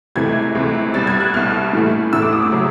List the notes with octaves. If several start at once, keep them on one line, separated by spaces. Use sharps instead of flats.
C#2 C3 E3 A3 G#6
C#2 C3 E3 A3
C2 B2 G3 A6
G#6
F#6
C2 B2 G3 F6
A2 E3 A3
A2 E3 A3 E6
D6
D#6
D6
C#3 F#3